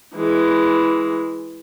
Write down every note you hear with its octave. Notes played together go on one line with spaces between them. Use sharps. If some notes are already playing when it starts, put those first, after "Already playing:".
E3 G#3